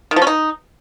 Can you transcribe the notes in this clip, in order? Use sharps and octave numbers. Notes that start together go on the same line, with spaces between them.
D#3
F3
C#4
D#4